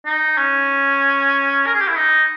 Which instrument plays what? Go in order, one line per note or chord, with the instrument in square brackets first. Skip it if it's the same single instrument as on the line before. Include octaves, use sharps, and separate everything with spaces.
[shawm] D#4
C#4
A#4
G#4
G4
E4
D#4